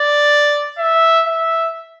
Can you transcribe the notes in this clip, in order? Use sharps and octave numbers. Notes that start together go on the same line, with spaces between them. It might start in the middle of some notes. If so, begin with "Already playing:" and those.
Already playing: D5
E5
E5